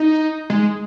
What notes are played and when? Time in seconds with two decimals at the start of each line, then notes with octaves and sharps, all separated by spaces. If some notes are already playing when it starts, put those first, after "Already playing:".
Already playing: D#4
0.50 G#3